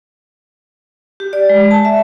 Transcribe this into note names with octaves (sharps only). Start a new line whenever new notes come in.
G4
D5
G#3
A5
E5